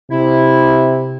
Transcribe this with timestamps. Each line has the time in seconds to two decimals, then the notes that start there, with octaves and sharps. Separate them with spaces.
0.11 C3 E4